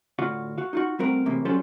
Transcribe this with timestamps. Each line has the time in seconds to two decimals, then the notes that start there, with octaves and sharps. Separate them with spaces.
0.19 A2 D3 F4 F#4 F5
0.58 F#4 F5
0.73 D#4 F4 F#4
0.99 G3 A3 C4 F#4 A#4 F5
1.26 E2 A2 C3 A#3
1.45 F#3 G3 C#4 F4 A4 C5